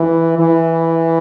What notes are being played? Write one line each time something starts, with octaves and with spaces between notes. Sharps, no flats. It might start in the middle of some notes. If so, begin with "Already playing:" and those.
Already playing: E3
E3